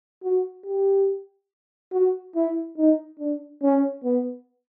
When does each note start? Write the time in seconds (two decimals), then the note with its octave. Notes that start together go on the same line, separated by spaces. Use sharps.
0.24 F#4
0.66 G4
1.93 F#4
2.36 E4
2.78 D#4
3.19 D4
3.62 C#4
4.04 B3